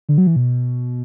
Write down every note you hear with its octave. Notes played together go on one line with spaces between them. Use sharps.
D3
F#3
E3
B2